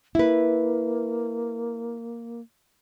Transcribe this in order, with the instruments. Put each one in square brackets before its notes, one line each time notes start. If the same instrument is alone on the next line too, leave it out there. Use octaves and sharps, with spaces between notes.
[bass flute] A#3 [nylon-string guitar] E4 B4